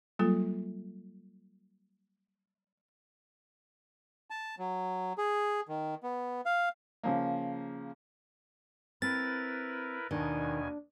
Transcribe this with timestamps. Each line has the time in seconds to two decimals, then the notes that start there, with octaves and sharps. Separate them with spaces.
0.19 F#3 G3 A#3 F4 A4
4.30 A5
4.59 F#3
5.18 G#4
5.68 D#3
6.03 B3
6.46 F5
7.04 C#3 F3 A#3
9.02 C4 E4 A#4 B4 A6
10.11 D#2 B2 D#3 D4 G#5